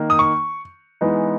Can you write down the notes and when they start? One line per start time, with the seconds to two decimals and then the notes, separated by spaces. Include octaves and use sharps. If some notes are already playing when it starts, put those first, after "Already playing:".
Already playing: D#3 A#3 D#4
0.10 D#6
0.19 C#6
1.01 E3 G#3 B3 D#4